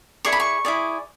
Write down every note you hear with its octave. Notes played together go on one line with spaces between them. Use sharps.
E4 G#4 D5 C#6
B5
C#6
E4 G#4 D5